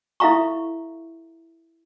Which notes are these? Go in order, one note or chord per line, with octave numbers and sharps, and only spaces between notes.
E4 A4 E5 F5 A#5 C#6